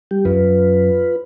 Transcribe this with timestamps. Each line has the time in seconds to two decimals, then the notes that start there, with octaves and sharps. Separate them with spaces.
0.11 G3 G4
0.25 F#2 F4 B4